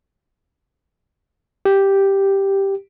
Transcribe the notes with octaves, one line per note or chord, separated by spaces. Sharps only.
G4